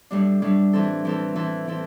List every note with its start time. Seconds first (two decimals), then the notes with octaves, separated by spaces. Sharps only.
0.11 A2 G3 D4
0.42 A2 G3 D4
0.73 E3 C4 A4
1.05 E3 C4 A4
1.35 E3 C4 A4
1.67 E3 C4 A4